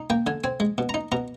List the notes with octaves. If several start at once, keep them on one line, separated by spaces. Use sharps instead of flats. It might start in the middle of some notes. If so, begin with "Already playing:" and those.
Already playing: D#4
A#3 G5
D3 G#5
C4 G#5
G#3
B2
D#4 A#5
B2 A#5